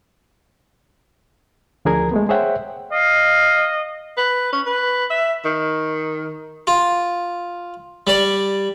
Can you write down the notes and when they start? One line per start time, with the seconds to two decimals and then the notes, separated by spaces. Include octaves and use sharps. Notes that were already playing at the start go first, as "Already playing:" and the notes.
1.85 D2 F3 D4 G#4 A#4 G#6
2.11 G#3 A3 B3
2.29 G#4 C5 C#5 E5 F#5 G5
2.93 D#5 F5
4.17 B4
4.53 C#4
4.66 B4
5.10 E5
5.45 D#3
6.67 F4
8.07 G3 D5